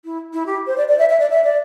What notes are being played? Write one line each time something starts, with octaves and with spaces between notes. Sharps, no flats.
E4
E4
G4
C5
D5
D5
E5
E5
D5
E5
D5